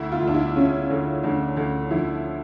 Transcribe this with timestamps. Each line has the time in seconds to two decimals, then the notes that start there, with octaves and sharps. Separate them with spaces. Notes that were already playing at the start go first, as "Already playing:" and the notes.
Already playing: D2 E4
0.12 F4
0.22 D2
0.28 D4
0.34 E4
0.56 C#3 C#4
0.90 D2
1.23 D2 D4
1.57 D2
1.91 F3 E4